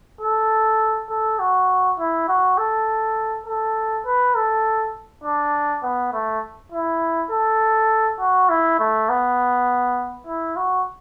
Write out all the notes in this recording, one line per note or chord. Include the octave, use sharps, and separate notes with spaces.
A4
A4
F#4
E4
F#4
A4
A4
B4
A4
D4
B3
A3
E4
A4
F#4
E4
A3
B3
E4
F#4